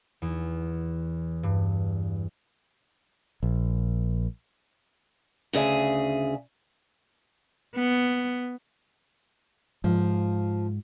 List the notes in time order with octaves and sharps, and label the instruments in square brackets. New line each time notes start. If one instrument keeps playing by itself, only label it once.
[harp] E2
G2
[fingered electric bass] A#1
[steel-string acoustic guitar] D2 C#3 G#4 E5
[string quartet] B3
[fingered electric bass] G#2 [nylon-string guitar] F3